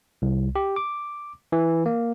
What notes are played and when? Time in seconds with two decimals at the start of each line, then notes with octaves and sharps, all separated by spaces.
0.22 C2
0.56 G4
0.76 D6
1.52 E3
1.86 A#3